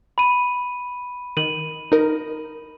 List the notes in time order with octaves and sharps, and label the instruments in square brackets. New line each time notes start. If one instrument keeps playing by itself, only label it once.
[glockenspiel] B5 D#7
[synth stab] D#3 [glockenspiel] D#7 F#7
[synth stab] D#4 A#4